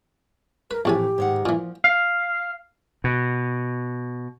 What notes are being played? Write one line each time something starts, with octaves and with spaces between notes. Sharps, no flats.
A#4 B4
A#1 A2 E3 A3 C4 G4 G#5
G#2 D#3 F#5
A#2 E3 F3
F5
B2